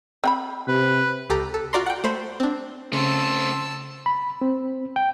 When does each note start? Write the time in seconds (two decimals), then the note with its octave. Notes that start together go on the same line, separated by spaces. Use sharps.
0.24 C4 F#5 B5
0.68 C3 B4
1.30 C#2 G4 A4 A#5
1.54 A4
1.73 F4 F#4 D5 A#5 C6
1.86 F#5 G5
2.04 A3 C5 B5
2.40 C4 D4
2.93 C#3 A3 C4 A5 C6 E6
4.06 B5
4.41 C4
4.96 G5